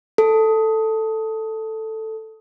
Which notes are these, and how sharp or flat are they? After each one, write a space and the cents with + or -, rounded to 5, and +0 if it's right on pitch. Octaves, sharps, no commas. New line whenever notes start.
A4 +5